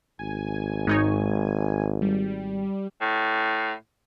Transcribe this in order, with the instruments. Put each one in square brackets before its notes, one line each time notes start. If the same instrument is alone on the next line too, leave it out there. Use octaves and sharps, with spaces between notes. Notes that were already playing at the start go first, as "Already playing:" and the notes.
[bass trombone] G#1 [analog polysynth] G#5
[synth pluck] G#2 D#4 C#5
[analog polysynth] G3
[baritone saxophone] A2